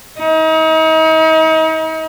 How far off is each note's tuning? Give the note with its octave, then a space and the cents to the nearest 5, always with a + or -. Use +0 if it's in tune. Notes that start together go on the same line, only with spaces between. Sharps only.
D#4 +40